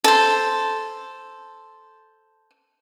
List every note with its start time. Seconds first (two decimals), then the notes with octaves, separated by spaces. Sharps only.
0.04 A4 C5